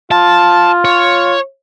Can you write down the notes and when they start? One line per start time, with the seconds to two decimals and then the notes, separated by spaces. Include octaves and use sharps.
0.12 F4 A5
0.85 C#5